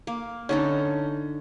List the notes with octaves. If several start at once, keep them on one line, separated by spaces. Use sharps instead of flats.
A#3
D3 C#4 D#4 A4